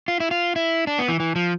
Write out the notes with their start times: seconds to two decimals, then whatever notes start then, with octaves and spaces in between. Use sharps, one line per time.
0.08 F4
0.20 E4
0.31 F4
0.56 E4
0.87 D4
0.98 B3
1.08 E3
1.20 E3
1.36 F3